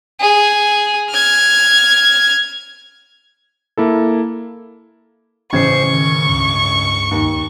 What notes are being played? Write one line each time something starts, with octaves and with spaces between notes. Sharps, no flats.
G#4
F6 G#6
A#3 E4 A4
A1 C#3 E3 C5 C#6 G#6 C7
D#3
C#2 G2
D#2